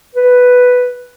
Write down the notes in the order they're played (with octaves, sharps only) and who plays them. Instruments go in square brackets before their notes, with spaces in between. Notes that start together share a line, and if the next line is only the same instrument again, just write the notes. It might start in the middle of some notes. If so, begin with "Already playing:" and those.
[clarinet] B4